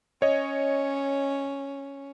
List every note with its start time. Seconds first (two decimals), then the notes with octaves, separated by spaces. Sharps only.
0.22 C#4 C#5 D#5